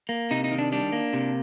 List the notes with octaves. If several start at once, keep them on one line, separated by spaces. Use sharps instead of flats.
A#3
C3 D#4
D#4
D#3
D4
G3 D4
A#3
C3